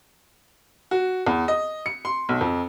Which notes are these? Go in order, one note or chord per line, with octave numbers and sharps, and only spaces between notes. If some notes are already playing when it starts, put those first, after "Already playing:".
F#4
E2
D#5
C#7
C6
B1
F2